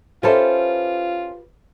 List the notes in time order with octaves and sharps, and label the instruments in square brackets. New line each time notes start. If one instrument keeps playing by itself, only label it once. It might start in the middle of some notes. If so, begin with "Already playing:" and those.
[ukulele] C#4 A4 E5 [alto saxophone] F4 [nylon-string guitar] G4 B4 C5